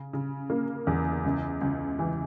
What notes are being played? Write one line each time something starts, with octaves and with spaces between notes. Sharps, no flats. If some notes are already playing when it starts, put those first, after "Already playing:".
Already playing: C#3
C#3
A#3
E2
C#2
C#2
E3